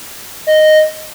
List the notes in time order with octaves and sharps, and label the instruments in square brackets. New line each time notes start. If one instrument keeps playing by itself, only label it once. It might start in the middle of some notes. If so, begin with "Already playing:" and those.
[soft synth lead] D#5